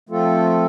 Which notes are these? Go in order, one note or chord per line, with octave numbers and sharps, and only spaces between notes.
F3 A3 C4 F4 A4